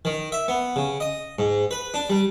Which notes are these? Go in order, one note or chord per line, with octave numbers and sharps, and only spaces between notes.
D#3
E5
B3
C#3
D#5
G#2
B4
D4
G3